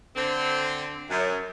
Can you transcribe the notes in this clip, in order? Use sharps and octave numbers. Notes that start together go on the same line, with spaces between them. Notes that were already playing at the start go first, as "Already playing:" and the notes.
D3 C4
F#2